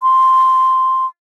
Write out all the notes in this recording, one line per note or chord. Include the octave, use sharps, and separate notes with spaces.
C6